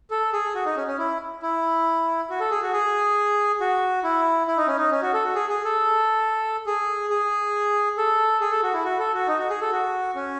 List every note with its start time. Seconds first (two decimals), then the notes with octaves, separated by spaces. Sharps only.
0.11 A4
0.33 G#4
0.55 F#4
0.66 D#4
0.77 C#4
0.87 C#4
0.98 E4
1.43 E4
2.30 F#4
2.40 A4
2.50 G#4
2.62 F#4
2.73 G#4
3.60 F#4
4.04 E4
4.48 E4
4.57 D#4
4.67 C#4
4.77 D#4
4.91 C#4
5.02 F#4
5.13 A4
5.24 F#4
5.35 G#4
5.49 G#4
5.65 A4
6.66 G#4
7.10 G#4
7.98 A4
8.41 G#4
8.51 A4
8.63 F#4
8.74 E4
8.85 F#4
8.99 A4
9.14 F#4
9.28 D#4
9.39 F#4
9.50 G#4
9.61 A4
9.72 F#4
10.15 C#4